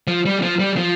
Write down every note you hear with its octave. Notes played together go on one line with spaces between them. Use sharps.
F3
G3
F3
G3
F3